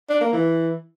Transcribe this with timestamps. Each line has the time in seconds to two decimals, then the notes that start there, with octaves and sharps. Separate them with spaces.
0.09 D4
0.21 A#3
0.33 E3